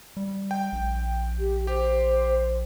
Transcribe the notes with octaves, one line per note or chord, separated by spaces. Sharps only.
G3
G5
A#1
G4
G4 C5